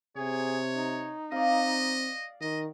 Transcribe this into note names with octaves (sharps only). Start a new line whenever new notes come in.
C3 G#4 C#5
D#4
C4 D5 D#5 F5
D#3 D#5